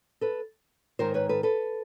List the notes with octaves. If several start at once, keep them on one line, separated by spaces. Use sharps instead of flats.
A4 B4
G#2 D#3 A#4 C5
B4 C#5
A4 B4
A4 B4